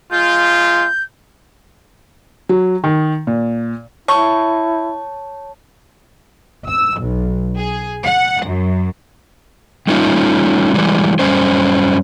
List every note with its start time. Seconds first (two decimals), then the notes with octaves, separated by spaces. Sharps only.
0.12 G#3 F4 G6
2.49 F#3
2.84 D#3
3.27 A#2
4.08 E4 C#5 A5 C#6
6.66 E6
6.98 B1
7.59 G#4
8.03 F#5
8.45 F#2
9.87 G3 A3 C#4 D#4 F4
10.74 E3 G3 G#3
11.19 F#2 G3 C#4 C5